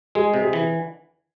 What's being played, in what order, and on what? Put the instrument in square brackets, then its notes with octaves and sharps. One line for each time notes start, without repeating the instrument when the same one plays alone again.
[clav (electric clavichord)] G#3 [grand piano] G#4
[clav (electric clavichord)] C3
[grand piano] G#4
[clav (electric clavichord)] E3